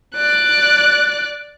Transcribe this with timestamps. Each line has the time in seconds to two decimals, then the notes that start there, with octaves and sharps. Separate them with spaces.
0.14 D5 F#6